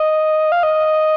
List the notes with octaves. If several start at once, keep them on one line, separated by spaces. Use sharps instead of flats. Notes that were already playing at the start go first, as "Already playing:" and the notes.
Already playing: D#5
F5
D#5